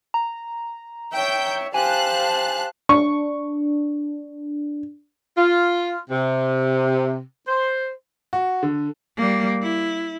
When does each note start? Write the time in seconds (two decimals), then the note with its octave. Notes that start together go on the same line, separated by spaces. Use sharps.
0.14 A#5
1.13 C#5 E5 G5 G6
1.74 G4 C5 F5 G#5 A5 F#6
2.89 D4 C#6
5.38 F4
6.10 C3
7.48 C5
8.33 F#4
8.63 D3
9.17 G3 A#3
9.63 E4